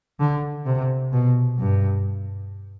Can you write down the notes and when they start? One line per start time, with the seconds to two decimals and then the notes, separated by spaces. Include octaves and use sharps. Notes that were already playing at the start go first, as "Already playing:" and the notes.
0.20 D3
0.66 C3
1.12 B2
1.59 G2